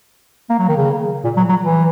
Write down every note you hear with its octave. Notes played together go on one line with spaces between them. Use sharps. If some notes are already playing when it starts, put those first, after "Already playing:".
A#3
F#3
D#3
C#3
A#2
F#3
F#3
E3